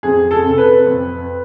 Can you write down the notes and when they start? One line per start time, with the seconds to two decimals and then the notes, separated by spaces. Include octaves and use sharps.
0.03 F2 G#4
0.31 A4
0.44 C3
0.58 B4
0.86 F2